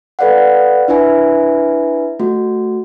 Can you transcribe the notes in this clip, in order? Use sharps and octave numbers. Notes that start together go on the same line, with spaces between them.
A4 B4 D5 F5 F#5
D4 E4 B4 E5 G#5
A3 F#4